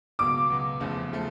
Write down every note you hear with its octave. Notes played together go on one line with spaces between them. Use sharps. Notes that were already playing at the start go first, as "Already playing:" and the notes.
C#2 B2 F#3 B3 D6
C#2 B2 F#3 B3
F1 E2 C#3 F3 A3
C#3 F3 A3